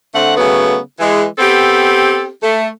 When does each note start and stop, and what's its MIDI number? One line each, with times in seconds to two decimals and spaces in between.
0.14 0.35 50
0.14 0.35 57
0.14 0.35 60
0.14 0.35 78
0.37 0.77 49
0.37 0.77 54
0.37 0.77 57
0.37 0.77 59
0.98 1.23 52
0.98 1.23 56
1.38 2.28 59
1.38 2.28 60
1.38 2.28 67
1.38 2.28 69
2.42 2.66 57